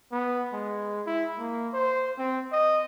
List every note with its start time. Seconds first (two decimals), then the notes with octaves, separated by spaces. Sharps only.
0.12 B3
0.53 G#3
1.06 E4
1.39 A#3
1.74 C5
2.18 C4
2.52 D#5